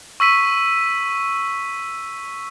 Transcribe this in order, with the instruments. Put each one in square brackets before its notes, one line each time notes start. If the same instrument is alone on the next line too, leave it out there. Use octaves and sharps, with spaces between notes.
[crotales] C#6 E6 B6 D#7